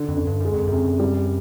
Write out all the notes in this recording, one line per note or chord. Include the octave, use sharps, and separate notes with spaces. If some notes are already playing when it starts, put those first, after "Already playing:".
Already playing: D3
F2
D3
G2
F#2 G#3
F2
F#2 C3
G3